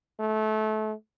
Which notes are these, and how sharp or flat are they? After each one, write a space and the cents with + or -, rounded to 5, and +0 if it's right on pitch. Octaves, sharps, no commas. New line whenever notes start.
A3 -25